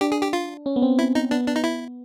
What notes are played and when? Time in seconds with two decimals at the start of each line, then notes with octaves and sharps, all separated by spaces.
0.01 D4 G4
0.12 G#4
0.23 G4
0.33 F4
0.66 C#4
0.76 B3
0.82 C4
0.99 E4
1.15 D#4
1.31 B3 D4
1.47 D4
1.56 D#4
1.64 E4